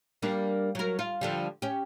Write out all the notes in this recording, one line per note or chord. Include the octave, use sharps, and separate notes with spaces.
G3 A#3 D4
F#3 A#4
F4
D3 F3 G3
C#4 G4